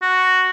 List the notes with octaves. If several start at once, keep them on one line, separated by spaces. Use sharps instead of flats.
F#4